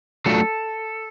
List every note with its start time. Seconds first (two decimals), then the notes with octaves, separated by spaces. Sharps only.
0.26 F#3 A3 D4 F4 A4